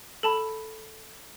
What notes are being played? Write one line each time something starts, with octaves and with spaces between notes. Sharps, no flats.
A4 A5 B5